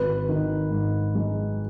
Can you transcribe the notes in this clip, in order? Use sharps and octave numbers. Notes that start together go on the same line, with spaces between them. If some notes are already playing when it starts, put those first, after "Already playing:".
Already playing: G#1 B4
D#3
G#2
G#3